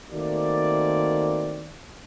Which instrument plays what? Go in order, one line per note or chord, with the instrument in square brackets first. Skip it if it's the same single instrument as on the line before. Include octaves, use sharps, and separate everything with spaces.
[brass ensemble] D#3 A3 A#3 C4 F#4 D5